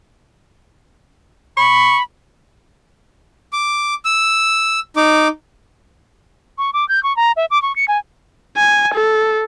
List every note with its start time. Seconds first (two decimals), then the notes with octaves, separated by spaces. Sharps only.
1.57 B5 C#6
3.53 D6
4.05 E6
4.97 D#4 D6
6.58 C#6
6.73 D6
6.89 G6
7.03 C#6
7.17 A#5
7.36 E5
7.51 D6
7.62 C#6
7.76 C#7
7.88 G#5
8.57 G#5
8.95 A4